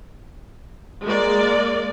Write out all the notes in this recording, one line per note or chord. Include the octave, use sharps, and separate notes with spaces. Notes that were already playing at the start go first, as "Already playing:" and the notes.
G#3 A#3 D5